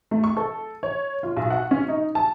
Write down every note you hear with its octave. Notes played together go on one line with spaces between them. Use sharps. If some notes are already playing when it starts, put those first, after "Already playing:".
A3
C#6
A4
C#5
F4
B1
F#5
C#4
D#4
A5